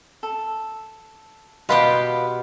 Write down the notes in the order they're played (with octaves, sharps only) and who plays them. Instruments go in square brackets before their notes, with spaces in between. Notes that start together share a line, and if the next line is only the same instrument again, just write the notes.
[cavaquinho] A4
[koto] B2 B3 G4 [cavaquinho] B4 F5 C6